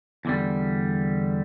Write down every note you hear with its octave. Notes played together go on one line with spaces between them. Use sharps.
E2 D3 G3